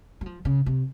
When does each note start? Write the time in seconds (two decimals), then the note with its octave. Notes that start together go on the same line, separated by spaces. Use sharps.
0.21 F#3
0.26 F3
0.45 C#3
0.66 C3